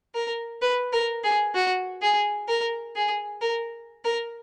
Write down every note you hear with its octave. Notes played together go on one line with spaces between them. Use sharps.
A#4
B4
A#4
G#4
F#4
G#4
A#4
G#4
A#4
A#4